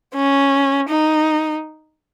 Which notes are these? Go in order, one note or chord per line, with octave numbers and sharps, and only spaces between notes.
C#4
D#4